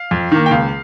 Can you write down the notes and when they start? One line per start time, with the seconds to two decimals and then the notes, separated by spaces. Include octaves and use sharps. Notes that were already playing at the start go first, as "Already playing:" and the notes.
Already playing: F5
0.11 F2
0.32 D#3 A#3
0.46 G5
0.51 C#2 F5